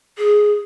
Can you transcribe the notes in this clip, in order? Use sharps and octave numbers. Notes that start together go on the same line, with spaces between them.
G#4